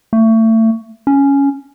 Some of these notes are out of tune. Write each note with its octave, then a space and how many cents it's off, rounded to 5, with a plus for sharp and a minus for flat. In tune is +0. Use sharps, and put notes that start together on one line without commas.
A3 +30
C#4 +5